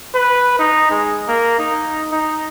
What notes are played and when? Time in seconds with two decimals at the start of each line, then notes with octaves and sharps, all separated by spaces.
0.15 B4
0.59 D#4
0.91 G#3
1.28 A#3
1.59 D#4
2.12 D#4